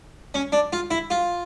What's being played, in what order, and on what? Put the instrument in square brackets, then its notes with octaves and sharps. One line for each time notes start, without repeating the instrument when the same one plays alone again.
[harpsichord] C#4
D4
F4
E4
F4